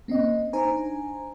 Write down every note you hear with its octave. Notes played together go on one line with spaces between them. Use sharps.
A#3 C4 C#4 D#5
D4 D#4 C5 G#5 A#5